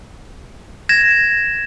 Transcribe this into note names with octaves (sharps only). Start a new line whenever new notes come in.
G#6 A#6 E7